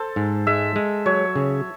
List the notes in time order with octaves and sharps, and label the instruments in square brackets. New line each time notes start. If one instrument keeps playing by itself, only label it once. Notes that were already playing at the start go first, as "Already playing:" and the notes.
Already playing: [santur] A4 C5
[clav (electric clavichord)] G#2
[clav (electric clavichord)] G#3 [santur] E5
[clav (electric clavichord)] G#3
[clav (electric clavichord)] F#3 [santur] C#5
[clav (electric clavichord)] C#3